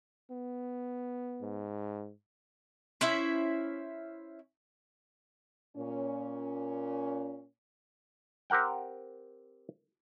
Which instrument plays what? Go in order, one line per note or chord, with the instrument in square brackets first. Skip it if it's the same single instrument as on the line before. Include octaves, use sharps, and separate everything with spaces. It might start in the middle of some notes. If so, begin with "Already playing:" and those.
[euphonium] B3
[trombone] G#2
[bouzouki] C#4 E4 C5 E5
[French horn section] A#2 C#4
[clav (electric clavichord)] C4 G4 A#4 F#5 G5